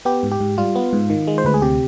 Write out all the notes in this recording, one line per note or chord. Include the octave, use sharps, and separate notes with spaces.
B3 G4
G#2
G4
G#2
G3 F4
B3
G#2
D#3
G#3
C5
D2 B4
G#4
C3 G4